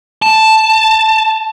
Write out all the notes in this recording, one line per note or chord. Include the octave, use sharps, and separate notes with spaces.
A5